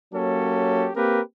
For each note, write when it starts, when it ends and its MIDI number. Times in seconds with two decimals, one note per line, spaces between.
0.13 0.89 54
0.13 0.89 58
0.13 0.89 61
0.13 0.89 67
0.13 0.89 69
0.95 1.19 58
0.95 1.19 60
0.95 1.19 67
0.95 1.19 70
0.95 1.19 71